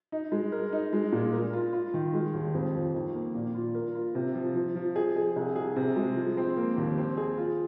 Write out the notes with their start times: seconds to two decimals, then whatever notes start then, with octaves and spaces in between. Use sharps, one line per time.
0.12 D#4
0.32 G#3
0.52 A#4
0.73 D#4
0.93 G#3
1.12 A#2
1.32 A#4
1.53 F4
1.73 F4
1.94 D#3
2.13 G#3
2.34 D#2
2.54 F2
2.74 F3
2.94 D#3
3.14 A#3
3.35 A#2
3.55 F4
3.75 A#4
3.95 F4
4.15 C3
4.35 F3
4.55 F3
4.75 F3
4.96 G#4
5.16 G#4
5.36 C2
5.56 G#4
5.76 C3
5.96 G#3
6.17 F3
6.37 C4
6.57 A#3
6.77 D#2
6.98 C4
7.17 G#4
7.38 F4